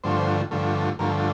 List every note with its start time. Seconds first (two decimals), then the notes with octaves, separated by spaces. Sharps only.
0.04 G2 D3 F3 A3 C5
0.51 G2 D3 F3 A3
0.99 G2 D3 F3 A3 A#4